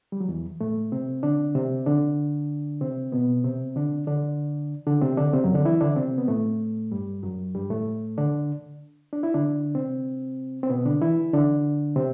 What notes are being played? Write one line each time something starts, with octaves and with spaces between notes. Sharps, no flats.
G3
F#3
E2 E3
A2 A3
C3 C4
D3 D4
C3 C4
D3 D4
C3 C4
B2 B3
C3 C4
D3 D4
D3 D4
D3 D4
C3 C4
D3 D4
C3 C4
F#2 F#3
D3 D4
E3 E4
D3 D4
C3 C4
B3
A2 A3
G2 G3
F#2 F#3
G2 G3
A2 A3
D3 D4
D4
E4
D3 D4
C3 C4
C4
B2 B3
D3 D4
E3 E4
D3 D4
C3 C4